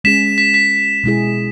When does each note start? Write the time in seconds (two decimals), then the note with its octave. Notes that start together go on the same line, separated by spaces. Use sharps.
0.04 G#3 C#4 G#4 B6 E7
0.38 B6
0.54 B6
1.04 B2 G#3 E4 G#4